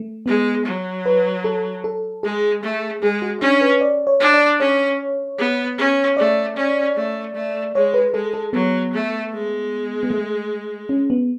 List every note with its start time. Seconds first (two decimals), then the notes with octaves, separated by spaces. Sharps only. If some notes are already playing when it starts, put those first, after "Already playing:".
Already playing: A3
0.26 G#3 B3
0.66 F#3
1.06 B4
1.44 A4
1.84 A4
2.23 G#3 G#4
2.63 A3
3.02 G#3 G#4
3.22 F#4
3.41 C#4 D4
3.61 B4
3.81 D5
4.07 C#5
4.20 D4
4.34 D5
4.60 C#4 C#5
5.38 B3
5.78 C#4
6.17 A3 D5
6.56 C#4
6.96 A3
7.35 A3
7.75 G#3 C#5
7.94 B4
8.14 G#3 A4
8.34 A4
8.53 F#3 B3
8.93 A3
9.33 G#3
10.03 B3
10.10 A3
10.89 C#4
11.10 B3